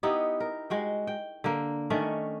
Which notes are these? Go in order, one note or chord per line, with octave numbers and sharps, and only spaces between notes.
B3 D#4 E4 G4
A#4
G#3 F#4 G5
G5
D3 A#3
D#3 A3 C#4 D4